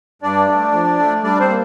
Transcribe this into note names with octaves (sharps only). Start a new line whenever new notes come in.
G2 D4 D5
A3
F3
A3
G3 D4 D5
C4 C5
A#3